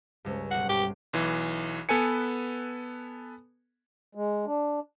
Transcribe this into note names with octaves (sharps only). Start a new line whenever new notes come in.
C#2 G2
B1 F#5 C7
G2 G4 D7
B1 E3
B3 A4 B4 G#5 C#7
G#3
D4